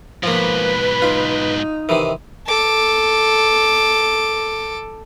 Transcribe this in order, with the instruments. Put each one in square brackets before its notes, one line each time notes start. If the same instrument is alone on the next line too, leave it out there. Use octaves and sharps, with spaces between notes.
[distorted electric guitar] G#2 B2 [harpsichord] F3 A#3 [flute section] B4
[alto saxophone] D#4 [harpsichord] F4
[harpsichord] C3 D#3 E3
[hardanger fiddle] A4 D6